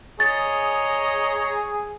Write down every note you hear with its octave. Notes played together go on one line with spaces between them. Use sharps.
G#4 C#5 D#5 A#5 A6